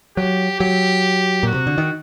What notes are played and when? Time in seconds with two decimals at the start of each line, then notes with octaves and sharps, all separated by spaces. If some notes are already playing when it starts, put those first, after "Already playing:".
0.17 F#3 G4
0.59 F#3 G4
1.43 A#2 F#4
1.54 C3
1.67 D3
1.78 D#3